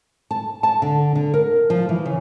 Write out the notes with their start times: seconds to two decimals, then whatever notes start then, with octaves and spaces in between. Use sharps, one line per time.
0.31 A5
0.63 A5
0.82 D3
1.16 D3
1.34 A#4
1.70 F3
1.89 E3
2.06 C#3